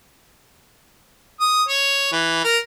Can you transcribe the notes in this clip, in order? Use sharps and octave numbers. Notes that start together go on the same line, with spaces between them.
D#6
C#5
E3
A#4